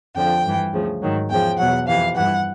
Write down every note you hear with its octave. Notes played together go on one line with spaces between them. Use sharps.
F2 D3 F3 G5
G2 E3
D2 C#3 F3
G#2 D#3 F#3
E2 C#3 F3 G5
E2 B2 F#3 F#5
F2 C3 E3 F5
G2 E3 F#5